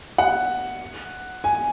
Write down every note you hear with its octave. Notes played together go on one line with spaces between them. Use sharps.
F#5
G#5